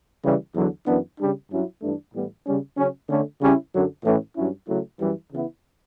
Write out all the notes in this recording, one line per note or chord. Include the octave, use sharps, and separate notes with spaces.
C#3 E3 G3
E2 D3 F#3
F#2 E3 B3 D4
C#3 G3 D4
G2 F#3 C#4 E4
G2 E3 A3 D4
A2 E3 G3 B3
C#3 G3 C#4
C#3 F#3 C#4
D3 A3 C#4
C#3 G3 C#4 E4
F#2 D3 F#3
A2 E3 A3 C#4
G2 F#3 C#4 E4
C#3 F#3 A3 E4
F#2 E3 G3
C#3 E3 B3 E4